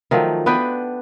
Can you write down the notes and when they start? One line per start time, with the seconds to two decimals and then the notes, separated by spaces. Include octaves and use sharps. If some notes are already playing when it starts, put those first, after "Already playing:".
0.11 D#3 F3 F#3 A3
0.46 B3 D4 B4 G5